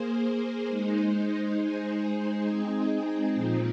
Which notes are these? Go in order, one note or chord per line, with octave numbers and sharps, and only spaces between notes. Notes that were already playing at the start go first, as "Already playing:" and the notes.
Already playing: A#3 G#4 C5
G#3 D#4 C5
G#3 D#4 G#4 C5
G#3 C4 D#4 G#4
A#2 F3 C4 D#4